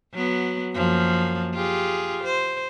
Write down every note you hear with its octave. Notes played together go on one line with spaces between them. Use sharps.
F#3 B3
F#2 F3 A#3
F4 G4 G#4
C5